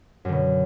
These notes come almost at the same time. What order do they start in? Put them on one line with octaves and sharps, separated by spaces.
F#2 D3 B2